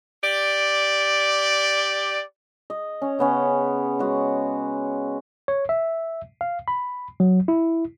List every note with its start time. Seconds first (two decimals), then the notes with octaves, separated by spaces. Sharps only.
0.23 G4 D5
2.70 D#5
3.02 C#4
3.19 C#3 B3 C#4
3.99 G#3 F#4
5.48 C#5
5.69 E5
6.41 F5
6.68 B5
7.20 F#3
7.48 E4